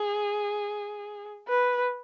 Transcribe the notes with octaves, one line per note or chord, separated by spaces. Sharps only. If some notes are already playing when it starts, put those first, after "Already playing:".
Already playing: G#4
B4